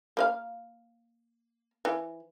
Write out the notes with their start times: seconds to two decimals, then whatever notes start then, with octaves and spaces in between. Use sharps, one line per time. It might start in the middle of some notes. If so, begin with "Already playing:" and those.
0.17 A#3 B4 F5
1.85 E3